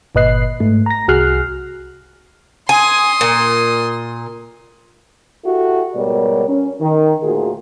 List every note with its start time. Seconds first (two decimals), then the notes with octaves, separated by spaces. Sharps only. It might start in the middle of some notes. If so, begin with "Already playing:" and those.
0.15 G1 A#2 B4 D#5 F#6 C7
0.60 G#2 A3
0.86 A#5 A#6
1.08 C2 F#4 G#4 F6 F#6 C7
2.69 G#5 C6 D#6
3.21 A#2
5.44 E4 F#4 G4 A4
5.95 G#2 B2 G3 A#4 C#5 D5
6.48 C#4
6.81 D#3
7.23 D2 A#2 A#3 F4 F#4 G#4